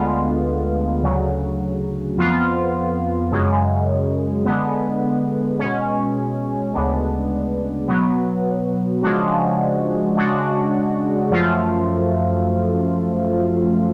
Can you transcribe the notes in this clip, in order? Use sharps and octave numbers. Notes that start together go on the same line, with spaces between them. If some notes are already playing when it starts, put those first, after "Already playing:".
Already playing: D2 D3 G#3 B3 F4
D2 C#3 F#3
F2 F3 B3 F4
F#2 C#3 G#3
D3 G#3 B3
B2 G#3 C#4
D2 C#3 G#3 B3 D4
B2 F#3 B3
C#3 F3 G#3 D4 F#4
C#3 G#3 D4 F#4
F#2 F3 A3 F4